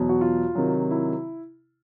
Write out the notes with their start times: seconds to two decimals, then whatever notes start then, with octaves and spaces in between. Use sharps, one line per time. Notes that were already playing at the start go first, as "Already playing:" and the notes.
Already playing: E2 B2 F#3
0.09 F#4
0.21 F4
0.55 C3 D#3 F#3
0.91 E4